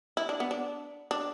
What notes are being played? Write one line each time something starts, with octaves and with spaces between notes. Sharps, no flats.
E4
D4
B3
D4
D4